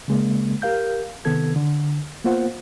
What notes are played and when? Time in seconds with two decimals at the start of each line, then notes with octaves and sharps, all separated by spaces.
0.08 C#3 G#3 A#3
0.62 G4 A#4 F5 G6
1.25 C3 D#3 B3 A4 G#6
1.56 D3
2.24 A#3 B3 F4 C5 F#5